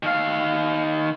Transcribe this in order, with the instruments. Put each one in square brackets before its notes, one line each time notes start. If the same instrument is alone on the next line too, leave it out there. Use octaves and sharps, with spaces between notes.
[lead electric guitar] D#3 F5